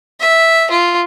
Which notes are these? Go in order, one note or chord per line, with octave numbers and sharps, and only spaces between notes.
E5
F4